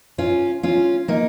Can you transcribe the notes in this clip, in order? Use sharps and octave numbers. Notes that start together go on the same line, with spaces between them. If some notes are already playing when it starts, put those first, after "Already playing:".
C#4 F4
C#4 F4
A#3 D#4